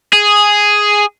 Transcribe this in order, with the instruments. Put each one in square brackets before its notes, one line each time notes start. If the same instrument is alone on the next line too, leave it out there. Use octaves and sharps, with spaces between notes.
[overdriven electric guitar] G#4